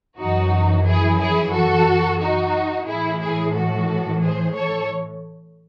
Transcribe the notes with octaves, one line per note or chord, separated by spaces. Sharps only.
F#2 E3 D#4 F#4
E4 G#4
E4 G#4
F#4 A4
D#4 F#4
A2 E3 E4 G#4
E4 G#4
F#4 A4
G#4 C5
A4 C#5